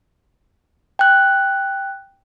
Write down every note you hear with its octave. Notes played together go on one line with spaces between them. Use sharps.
G5 F#6